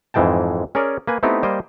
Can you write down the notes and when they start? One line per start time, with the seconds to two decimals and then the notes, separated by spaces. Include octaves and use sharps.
0.14 F2 G#2 E3 G#3 G5 A5
0.75 C#4 G#4 A#4 C#5 D5
1.07 A#3 B4 G#5
1.23 A3 B3 C4 D#4 E4 G4
1.43 G3 A#3 C5 D#5 G5